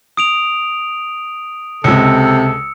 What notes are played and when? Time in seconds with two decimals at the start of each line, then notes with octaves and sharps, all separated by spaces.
0.17 D#6 D7 F7
1.84 C#2 C3 G#3 A4 E6 C#7